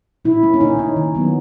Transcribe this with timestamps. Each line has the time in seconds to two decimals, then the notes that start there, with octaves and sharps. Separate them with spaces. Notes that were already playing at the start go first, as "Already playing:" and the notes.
0.25 A#2 E4
0.43 A#3 C#4
0.54 C#4
0.61 A#2 D#4
0.79 A#3 C#4
0.96 D#3
1.15 F#3 B3